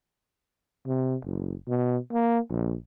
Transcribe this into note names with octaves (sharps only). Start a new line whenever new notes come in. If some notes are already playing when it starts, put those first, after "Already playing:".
C3
F#1
B2
A#3
A#1